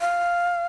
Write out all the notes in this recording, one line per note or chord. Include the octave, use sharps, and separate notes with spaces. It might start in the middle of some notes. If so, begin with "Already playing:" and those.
F5